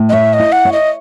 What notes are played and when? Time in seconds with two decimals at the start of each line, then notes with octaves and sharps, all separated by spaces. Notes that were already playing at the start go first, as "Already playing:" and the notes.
Already playing: A2
0.09 D#5
0.13 C#5 E5
0.33 D#5
0.39 E4
0.52 F#5
0.65 C#5
0.73 D#5